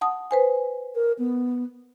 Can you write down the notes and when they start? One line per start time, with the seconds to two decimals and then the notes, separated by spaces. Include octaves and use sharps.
0.01 F#5 A5 D#6
0.31 B4 C5 G#5
0.95 A#4
1.19 B3